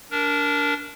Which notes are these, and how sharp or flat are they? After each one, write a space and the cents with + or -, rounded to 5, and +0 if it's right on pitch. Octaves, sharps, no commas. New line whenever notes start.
D4 -20 A#4 +0